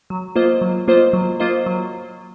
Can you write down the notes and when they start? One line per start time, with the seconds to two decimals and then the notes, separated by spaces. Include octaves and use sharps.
0.10 F#3
0.36 A#3 F4 C5 D#5
0.61 F#3
0.88 A#3 F4 C5 D#5
1.13 F#3
1.40 A#3 F4 C5 D#5
1.66 F#3